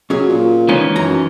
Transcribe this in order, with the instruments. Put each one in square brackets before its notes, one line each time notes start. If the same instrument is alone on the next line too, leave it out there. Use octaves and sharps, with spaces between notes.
[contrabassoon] F#3 [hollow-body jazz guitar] C#4 G#4
[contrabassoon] A#2
[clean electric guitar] D#3 E3 C#4 [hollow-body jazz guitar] G#3
[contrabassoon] F#2 [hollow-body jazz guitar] A#5